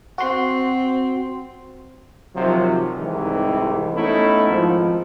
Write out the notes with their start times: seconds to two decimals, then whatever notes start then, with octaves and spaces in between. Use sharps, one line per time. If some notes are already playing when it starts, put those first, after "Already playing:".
0.18 C4 F#4 C6
2.35 C3 D#3 F3 F#3
2.96 C2 G#2 C3 D#3 E3
3.94 A3 B3 C#4 D#4 E4
4.49 G#1 G#2 F3